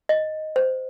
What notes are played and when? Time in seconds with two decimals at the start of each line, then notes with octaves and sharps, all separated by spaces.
0.09 D#5
0.56 C5